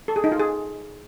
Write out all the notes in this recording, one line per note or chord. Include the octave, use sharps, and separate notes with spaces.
A4
G#4
D#4
F4
G#4